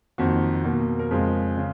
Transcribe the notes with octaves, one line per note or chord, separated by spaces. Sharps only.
F2 D#3 A#3 F#4
B2 A#3
A#4
F2 C#3 G#3 G#4
C#3